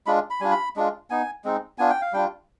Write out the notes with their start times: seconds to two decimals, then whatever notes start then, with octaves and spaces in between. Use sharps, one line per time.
0.06 G#3 D4 F4 B5
0.30 B5
0.41 G3 D4 F4 G#5
0.51 B5
0.76 G#3 D4 F4
1.10 B3 D#4 G#5
1.45 G#3 C4 D#4
1.78 B3 D4 F4 G#5
1.90 G5
2.02 F5
2.13 G3 D4 F4 G5